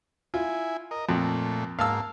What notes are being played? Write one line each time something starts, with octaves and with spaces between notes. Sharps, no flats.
E4 F4 G#5
A#4 D#5
F2 A#2 A3
G#2 A#3 F5 A5 E6